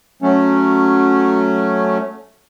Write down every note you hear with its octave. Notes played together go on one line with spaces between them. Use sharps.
F#3 A3 C#4